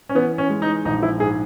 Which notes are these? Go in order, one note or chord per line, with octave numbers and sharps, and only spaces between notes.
C#4
E3 B3
C#4
G#3
D#4
A#1 D#4
E4
G#2 G#4